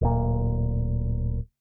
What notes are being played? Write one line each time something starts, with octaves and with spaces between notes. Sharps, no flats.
D1 A#2